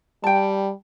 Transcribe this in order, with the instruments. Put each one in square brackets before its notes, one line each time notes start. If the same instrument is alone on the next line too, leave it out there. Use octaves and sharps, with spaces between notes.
[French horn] G3 [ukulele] G5 A5